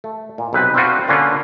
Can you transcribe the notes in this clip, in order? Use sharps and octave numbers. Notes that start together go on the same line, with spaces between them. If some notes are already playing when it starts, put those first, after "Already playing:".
A3
A#2
B1 C3 B3 B4
C4 D4 F4 F#4 B4
D3 A#3 C#4 F4 B4